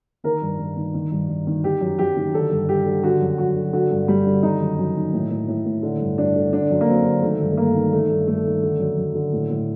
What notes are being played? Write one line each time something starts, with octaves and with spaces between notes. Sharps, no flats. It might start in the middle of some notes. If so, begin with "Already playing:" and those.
D#3 A#4
G2
G2
D#3
D#3
G2
G2
D#3
D#3 G4
F#2
F#2 G4
D#3
D3 A4
G2
G2 G4
D3
D3 F#4
F#2
F#2 F#4
D3
D3 F#4
G2
G2 G3
D3
D#3 D#4
F#2
F#2
D#3
A2
A2
A2
A2
D3
G2
G2 D4
D3
D3 D4
F#2
A#3
F#2 C4
D3
D#3 A3
G2
A3
G2 A#3
D#3
D#3 A3
G2
G2 A3
D#3
D3
F#2
F#2
D3
A2
A2